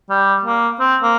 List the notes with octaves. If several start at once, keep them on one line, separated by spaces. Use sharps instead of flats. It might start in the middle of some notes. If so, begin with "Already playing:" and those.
G3
A#3
C4
A#3